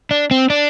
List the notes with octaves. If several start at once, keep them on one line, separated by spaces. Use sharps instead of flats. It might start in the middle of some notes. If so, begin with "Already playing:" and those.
D4
C4
D4